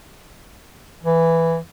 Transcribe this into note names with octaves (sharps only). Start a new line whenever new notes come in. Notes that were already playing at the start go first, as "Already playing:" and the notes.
E3